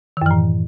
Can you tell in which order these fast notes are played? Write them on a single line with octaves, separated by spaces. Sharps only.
D#3 F#2 E3 A2